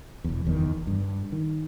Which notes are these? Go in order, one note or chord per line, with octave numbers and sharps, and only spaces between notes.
E1 E2
F#1 E2 G#2 D#3
G2
D#3